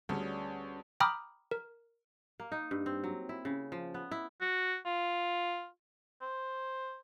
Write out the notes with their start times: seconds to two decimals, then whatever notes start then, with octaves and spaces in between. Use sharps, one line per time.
0.09 D2 G3 B3 C#4 G#4
1.00 G5 A#5 B5 D6 D#6 F6
1.51 A#4
2.40 A#3
2.52 D#4
2.71 G2
2.86 C4
3.04 F#3
3.29 E4
3.45 C#3
3.72 F3
3.94 B3
4.11 E4
4.41 F#4
4.85 F4
6.21 C5